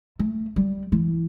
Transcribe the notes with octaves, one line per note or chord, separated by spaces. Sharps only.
A3
G3
E3